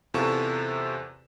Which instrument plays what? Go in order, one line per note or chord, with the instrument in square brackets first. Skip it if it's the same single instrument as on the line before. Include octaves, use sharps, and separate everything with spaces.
[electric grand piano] E2 C3 F4 A4 C#6 E7